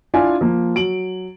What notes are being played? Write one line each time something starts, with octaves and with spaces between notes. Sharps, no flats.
D4 E4 F4 F5 G#5
F3 A#3
F#3 D7 F#7